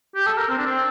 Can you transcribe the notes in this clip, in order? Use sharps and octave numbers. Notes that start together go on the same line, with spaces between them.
G4
A4
A#4
C4
D4
C4